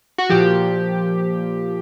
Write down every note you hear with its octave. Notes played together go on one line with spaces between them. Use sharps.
F#4
A#2 F3 G4